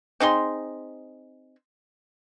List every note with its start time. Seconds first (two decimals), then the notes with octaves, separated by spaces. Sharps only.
0.20 C4 D#4 G#4 C6